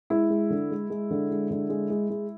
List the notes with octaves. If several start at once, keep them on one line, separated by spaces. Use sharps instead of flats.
G#3 E4
G#3
D3
G#3
G#3
D3
G#3
D3
G#3
G#3
G#3